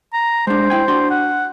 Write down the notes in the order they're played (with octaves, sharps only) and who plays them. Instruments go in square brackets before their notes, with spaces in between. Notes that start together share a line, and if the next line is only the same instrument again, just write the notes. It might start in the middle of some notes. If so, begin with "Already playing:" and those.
[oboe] A#5
[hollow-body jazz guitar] G#3 D4 [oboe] C5
[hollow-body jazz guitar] E4 G5 G#5
D4 F#4 C6
[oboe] F#5